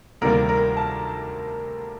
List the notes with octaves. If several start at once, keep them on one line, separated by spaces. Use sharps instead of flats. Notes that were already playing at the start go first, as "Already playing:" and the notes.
D2 C3 D#3 G3 A#3 A#4
A#4
A5